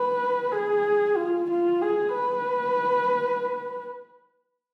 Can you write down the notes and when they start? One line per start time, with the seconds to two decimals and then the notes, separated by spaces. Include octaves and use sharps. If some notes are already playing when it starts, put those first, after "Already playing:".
Already playing: B4
0.52 G#4
1.16 F4
1.50 F4
1.81 G#4
2.14 B4